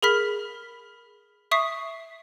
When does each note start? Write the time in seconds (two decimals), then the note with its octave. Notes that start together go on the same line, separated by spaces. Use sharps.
0.03 G#4 A#4 B5 F6 B6
1.51 E5 C#6 D#6 B6 C7